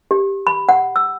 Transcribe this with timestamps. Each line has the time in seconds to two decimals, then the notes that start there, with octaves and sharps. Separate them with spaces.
0.11 G4
0.47 B5
0.69 F#5
0.96 E6